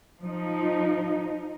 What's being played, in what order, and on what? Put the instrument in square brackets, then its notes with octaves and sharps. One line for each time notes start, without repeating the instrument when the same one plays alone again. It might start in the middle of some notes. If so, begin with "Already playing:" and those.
[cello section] F3 D#4